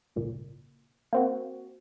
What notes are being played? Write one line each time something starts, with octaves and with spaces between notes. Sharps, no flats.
G#1 C#2 A#2
A#3 C4 F#4